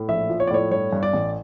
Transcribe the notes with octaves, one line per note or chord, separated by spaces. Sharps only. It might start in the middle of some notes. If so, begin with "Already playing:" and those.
Already playing: A2
A#1 E5
F3
C#5
D5
A2 C#5
G2 C#5
G2
D5
A1